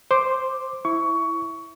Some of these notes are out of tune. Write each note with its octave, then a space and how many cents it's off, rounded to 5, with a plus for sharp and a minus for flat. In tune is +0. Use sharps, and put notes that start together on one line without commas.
C5 +0 D6 +0
E4 +0 C#6 +20